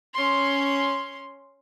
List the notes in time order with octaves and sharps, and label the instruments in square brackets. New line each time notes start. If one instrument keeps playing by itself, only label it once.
[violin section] C#4 C6